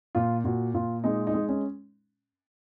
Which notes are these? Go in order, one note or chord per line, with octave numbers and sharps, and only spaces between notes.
A#2 F4
A#2 F#4
A#2 F4
G#3 D#4
D#4
G#3
C#4